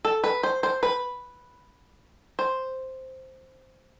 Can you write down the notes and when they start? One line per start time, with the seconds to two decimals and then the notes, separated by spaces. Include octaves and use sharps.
0.05 A4
0.24 B4
0.43 C5
0.63 C5
0.83 B4
2.39 C5